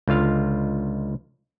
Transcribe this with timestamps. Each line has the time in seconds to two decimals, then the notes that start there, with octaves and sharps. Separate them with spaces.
0.08 C#2 D3 F4 F5